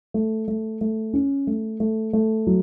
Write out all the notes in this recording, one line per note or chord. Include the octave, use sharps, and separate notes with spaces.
A3
A3
A3
C#4
A3
A3
A3
F#3